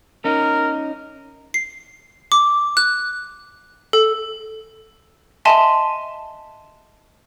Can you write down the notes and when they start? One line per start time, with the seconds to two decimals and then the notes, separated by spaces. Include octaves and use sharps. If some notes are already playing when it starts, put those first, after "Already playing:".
0.25 C#4 D#4 A#4
1.54 C7
2.32 D6
2.77 F#6
3.93 A4
5.45 D#5 E5 G#5 A5 C6